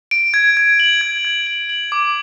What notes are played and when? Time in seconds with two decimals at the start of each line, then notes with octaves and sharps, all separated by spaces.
0.11 D7
0.34 G#6
0.57 G#6
0.80 F#7
1.01 G#6
1.25 G#6
1.47 F#7
1.69 F#7
1.92 D6